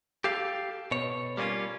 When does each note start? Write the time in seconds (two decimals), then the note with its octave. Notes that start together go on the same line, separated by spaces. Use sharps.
0.24 G4 A4 F5
0.91 B2 C#5
1.37 G3 A#3 C4 C#4 F4